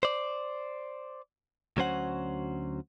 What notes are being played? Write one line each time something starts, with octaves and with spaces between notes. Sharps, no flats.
C5 D5
D2 F#3 C#4 C5 F#5